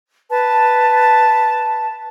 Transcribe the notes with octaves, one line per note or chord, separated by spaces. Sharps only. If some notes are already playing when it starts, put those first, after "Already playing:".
B4 A5